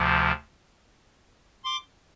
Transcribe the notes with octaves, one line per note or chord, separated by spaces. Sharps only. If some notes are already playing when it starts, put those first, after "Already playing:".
Already playing: D2 C3 F3
C6 D6